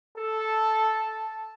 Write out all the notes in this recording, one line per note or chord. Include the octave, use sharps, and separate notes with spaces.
A4 A5